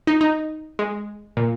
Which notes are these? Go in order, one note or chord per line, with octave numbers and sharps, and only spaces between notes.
D#4
D#4
G#3
A#2